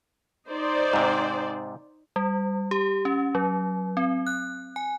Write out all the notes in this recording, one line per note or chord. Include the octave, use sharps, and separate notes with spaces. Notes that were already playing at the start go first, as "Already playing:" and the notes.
D#4 C5 D5
G#2 C3
G3
G4
C#4
F#3
C4
F#6
G#5